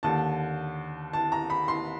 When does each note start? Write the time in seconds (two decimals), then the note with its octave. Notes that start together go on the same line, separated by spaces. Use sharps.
0.03 D#2 D3 A5
1.13 A5
1.32 A#5
1.50 B5
1.68 C6